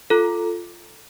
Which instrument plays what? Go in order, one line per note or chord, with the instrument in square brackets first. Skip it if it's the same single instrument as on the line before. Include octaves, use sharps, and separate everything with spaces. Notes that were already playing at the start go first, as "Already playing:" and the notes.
[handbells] F4 A4